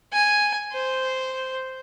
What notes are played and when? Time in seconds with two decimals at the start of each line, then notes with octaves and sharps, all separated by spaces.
0.13 G#5
0.73 C5